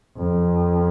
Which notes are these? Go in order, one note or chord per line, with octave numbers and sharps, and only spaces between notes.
F2